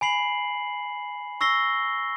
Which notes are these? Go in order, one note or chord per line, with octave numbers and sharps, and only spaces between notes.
G#5 B5 C7 F#7
C#6 E6 A#6 C7 G7